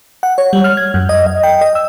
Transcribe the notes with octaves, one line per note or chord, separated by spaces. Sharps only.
F#5
C#5
G3
F6
G#6
F#2
D#5
D#5
G5
D#5
E6